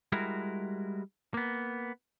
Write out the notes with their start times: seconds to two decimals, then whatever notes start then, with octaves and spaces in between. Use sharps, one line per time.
0.12 G3 G#3 E4 F#4 A#4
1.34 A#3 B3